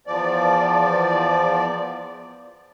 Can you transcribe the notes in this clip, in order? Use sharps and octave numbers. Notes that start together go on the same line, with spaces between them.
E2 F3 D5